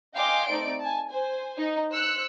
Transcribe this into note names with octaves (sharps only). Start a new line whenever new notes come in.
D#5 F5 G5 G#5 C6 D6
A3 C4 D#4 D5 D7
G#5 A5
C5 G#5
D#4
C5 E6 F#6 C#7